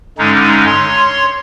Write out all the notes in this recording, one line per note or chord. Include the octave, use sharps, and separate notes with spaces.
G2 D3 G#3 C#4 D#4
C#5 C6